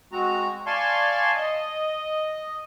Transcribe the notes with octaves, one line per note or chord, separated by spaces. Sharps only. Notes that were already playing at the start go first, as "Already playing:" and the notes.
G#3 C4 F#4 A#5
D5 F5 G#5 A5 C6 C#6
D#5